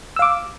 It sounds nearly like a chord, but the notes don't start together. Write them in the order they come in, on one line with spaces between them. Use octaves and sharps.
E6 F5 D6